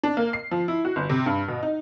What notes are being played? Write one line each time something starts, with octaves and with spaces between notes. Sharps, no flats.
D4
A#3
C7
F3
E4
F#4
G1
C3
G2
B2
D#4